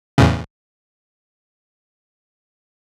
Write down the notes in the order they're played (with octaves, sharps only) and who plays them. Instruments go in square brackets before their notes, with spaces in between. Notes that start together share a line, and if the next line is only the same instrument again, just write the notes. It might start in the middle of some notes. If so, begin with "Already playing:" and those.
[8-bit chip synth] E2 A2 C#3